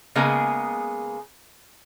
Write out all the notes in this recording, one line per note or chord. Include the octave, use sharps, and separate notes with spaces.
C#3 G#3 A#3 B3 G#4 A#5